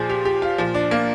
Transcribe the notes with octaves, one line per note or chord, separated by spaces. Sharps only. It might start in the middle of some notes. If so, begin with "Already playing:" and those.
Already playing: A#2 F3 G#4 C5
G4
G4
F4
A#2 F3
D4
A#3